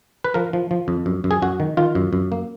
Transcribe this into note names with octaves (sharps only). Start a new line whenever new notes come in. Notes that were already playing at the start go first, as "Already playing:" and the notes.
B4
F3 A#4
F3
F3
F2
F#2
F#2
G#4
F#2 F#4
D#3
D#3 F4
F#2
F#2
A#3